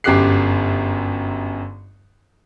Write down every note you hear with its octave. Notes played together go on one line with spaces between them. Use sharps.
G1 F#2 G4 D6 F#6 C7